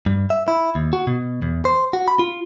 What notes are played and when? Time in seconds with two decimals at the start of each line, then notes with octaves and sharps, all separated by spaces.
0.06 G2
0.30 E5
0.48 E4
0.75 D#2
0.93 F#4
1.07 B2
1.42 E2
1.65 C5
1.93 F#4
2.08 B5
2.19 F4